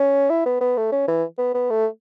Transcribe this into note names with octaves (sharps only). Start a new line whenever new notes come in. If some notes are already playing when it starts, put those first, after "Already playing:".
Already playing: C#4
E4
B3
B3
A3
C#4
E3
B3
B3
A3